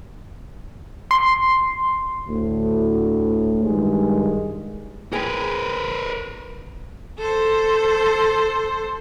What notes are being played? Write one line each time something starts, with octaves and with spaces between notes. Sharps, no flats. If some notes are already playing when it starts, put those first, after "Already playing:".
C6
D2 A2
G2 D#3 G#3
G#4 A#4 B4 G5
A4 C5